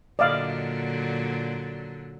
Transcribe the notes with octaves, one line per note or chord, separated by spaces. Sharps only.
A#2 D3 F#3 D5 D#5 F5